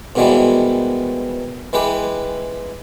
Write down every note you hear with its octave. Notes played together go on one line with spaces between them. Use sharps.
G#2 B2 D#3 E3 G3 G#3
E3 G#3 G4 B4